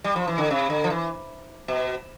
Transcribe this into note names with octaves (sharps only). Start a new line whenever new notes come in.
G3
F3
E3
D3
C3
D3
F3
E3
B2